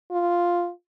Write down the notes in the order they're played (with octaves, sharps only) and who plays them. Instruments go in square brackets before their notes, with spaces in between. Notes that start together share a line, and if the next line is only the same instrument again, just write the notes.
[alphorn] F4